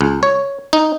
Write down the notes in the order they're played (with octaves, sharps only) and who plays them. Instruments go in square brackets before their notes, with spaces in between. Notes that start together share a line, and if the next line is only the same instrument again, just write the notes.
[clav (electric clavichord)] C#2
C#5
D#4